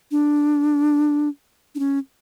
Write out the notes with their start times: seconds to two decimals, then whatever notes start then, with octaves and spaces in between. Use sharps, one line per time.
0.11 D4
1.75 D4
1.79 C#4